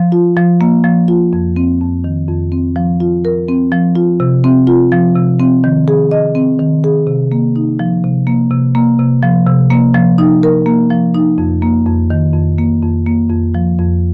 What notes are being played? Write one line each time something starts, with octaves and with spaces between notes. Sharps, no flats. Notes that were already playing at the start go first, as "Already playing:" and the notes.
Already playing: F3
F4
F3
A#3
F3
F4
F2
C4
F2
D#3
F2
C4
F3
F4
A#4
C4
F3
F4
C3
C4
F4
F3
C3
C4
D#3
G#4
D#5
C4
D#3
G#4
C3
A#3
D#4
F3
C3
A#3
C3
A#3
C3
F3
C3
A#3
F3
D#4
A#4
A#3
F3
D#4
F2
A#3
F2
D#3
F2
A#3
F2
A#3
F2
F3
F2